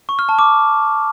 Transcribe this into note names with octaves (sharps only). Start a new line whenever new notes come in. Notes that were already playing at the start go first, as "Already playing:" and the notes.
C#6
F6
A5
D6